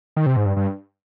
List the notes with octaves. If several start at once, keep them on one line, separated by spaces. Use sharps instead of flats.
D#3
C3
G#2
G2
G2